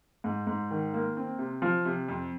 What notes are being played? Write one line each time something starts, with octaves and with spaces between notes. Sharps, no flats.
G#2
G#2
D#3
A#3
C4
C3
F3
C3
F2